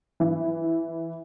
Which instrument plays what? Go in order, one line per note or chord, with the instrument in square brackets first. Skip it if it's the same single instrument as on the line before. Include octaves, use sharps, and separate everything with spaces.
[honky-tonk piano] E3